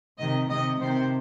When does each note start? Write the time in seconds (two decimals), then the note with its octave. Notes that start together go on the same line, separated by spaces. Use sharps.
0.19 C3 D#3 D#5
0.49 C3 D#3 D#5
0.80 C3 D#3 C5